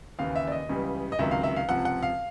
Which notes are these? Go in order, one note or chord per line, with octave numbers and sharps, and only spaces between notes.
D#2 C#3 E3 F5
E5
D5
D#5
C#2 C#3 E3 G3
D#5
C#2 C3 D#3 F#3 E5
F5
E5
F5
C#2 C3 F3 F#5
F#5
F5